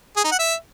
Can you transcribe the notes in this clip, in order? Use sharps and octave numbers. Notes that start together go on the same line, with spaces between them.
G#4
D#4
F#5
E5